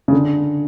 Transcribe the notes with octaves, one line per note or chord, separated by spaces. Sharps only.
C#3
D3